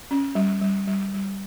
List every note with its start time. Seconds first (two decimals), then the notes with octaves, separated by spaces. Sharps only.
0.11 C#4
0.35 G3
0.61 G3
0.88 G3
1.14 G3